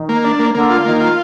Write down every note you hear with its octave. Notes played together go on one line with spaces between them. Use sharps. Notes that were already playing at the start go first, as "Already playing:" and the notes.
Already playing: D#3
A#3
D4
A#3
D3 A#3
F4
D#3 A#3
F4